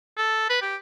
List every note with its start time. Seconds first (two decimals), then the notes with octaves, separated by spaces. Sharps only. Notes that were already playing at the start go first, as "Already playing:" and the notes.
0.17 A4
0.50 B4
0.62 G4